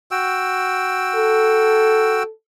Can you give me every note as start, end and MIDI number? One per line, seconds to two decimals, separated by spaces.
0.11 2.23 66
0.11 2.23 79
0.11 2.23 88
1.15 2.30 69